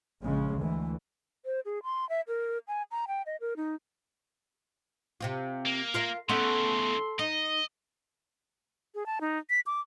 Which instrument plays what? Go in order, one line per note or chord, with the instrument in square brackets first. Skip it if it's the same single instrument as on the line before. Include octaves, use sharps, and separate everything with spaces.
[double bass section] A#1 C#3 G#3
D2 E3
[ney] C5
G#4
C6
E5
A#4
G#5
A#5
G5
D#5
A#4
D#4
[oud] C3 C4 F4
[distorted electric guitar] A#3
[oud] F4 A#4 E5
[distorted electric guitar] C#3 E3 [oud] A3 B3 C#4 [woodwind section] A4 C6
[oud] D#4 [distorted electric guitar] D#5
[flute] G#4
A5
D#4
B6
D6